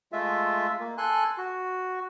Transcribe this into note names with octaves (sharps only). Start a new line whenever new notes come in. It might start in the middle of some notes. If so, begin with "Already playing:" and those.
G#3 A3 F4 E5
A#3
A4 G#5 C6 F#6
F#4